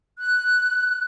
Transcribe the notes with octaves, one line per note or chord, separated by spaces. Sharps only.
F#6